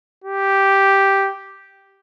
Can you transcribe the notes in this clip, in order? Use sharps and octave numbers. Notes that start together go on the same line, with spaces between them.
G4